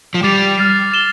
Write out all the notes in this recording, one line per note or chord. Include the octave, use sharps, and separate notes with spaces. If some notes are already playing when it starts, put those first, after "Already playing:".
F3
G3 D6 A6 C7 F7
F6 A6 C7
A6 E7 G7